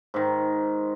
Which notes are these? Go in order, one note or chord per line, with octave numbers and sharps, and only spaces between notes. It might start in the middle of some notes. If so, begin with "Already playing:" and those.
G#2 D#3